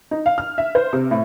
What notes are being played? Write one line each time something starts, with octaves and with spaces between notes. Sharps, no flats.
D#4
F5
F6
E5
C5
C3
A2